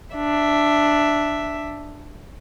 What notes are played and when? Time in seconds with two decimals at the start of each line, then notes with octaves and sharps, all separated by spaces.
0.15 D4 E5